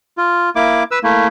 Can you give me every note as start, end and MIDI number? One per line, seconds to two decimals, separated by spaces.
0.18 0.50 65
0.56 0.83 58
0.56 0.83 64
0.56 0.83 86
0.91 0.99 71
0.91 0.99 88
1.03 1.27 57
1.03 1.27 58
1.03 1.27 64